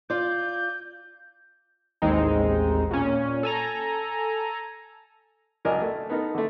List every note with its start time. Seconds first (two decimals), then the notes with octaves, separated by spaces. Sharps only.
0.10 F4 D5 G6
2.02 A1 D#2 G#3 C4 D#4
2.91 A#2 C#4
3.43 A4 G#5 A#5
5.65 C#2 F#3 D4 A#4 D#5 G#5
5.82 A3
6.10 B3 D#4 A4 A#4
6.35 D3 A3